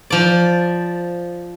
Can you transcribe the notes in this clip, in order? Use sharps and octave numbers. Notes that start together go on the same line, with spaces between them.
F3 D5